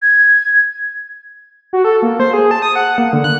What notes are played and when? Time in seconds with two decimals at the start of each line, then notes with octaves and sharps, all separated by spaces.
0.02 G#6
1.73 F#4
1.84 A4
2.02 A#3
2.20 C5
2.33 G#4
2.51 A5
2.62 D#6
2.75 F#5
2.98 A#3
3.13 D3
3.24 F#6